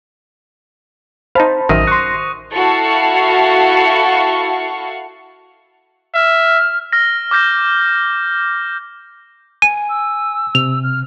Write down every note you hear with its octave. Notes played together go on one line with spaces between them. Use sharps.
D#4 C5 F5 A5 B5
A1 F#2 D#3 D#4 E5 D#6 A#6 D#7
C6 C#6 F#6 A#6 C#7
E4 F#4 A4 F5 C#6
E5 F6
F6 A#6
D6 F6 G6 A#6
G#5 D#7
E6
C3 F7
F6